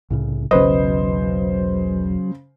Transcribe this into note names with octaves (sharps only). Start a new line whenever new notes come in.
C2 A2 C#3
E1 B1 C#3 F#3 B4 C5 D#5